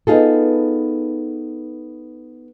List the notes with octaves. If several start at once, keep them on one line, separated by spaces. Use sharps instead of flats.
B3 D#4 F4 G#4 A4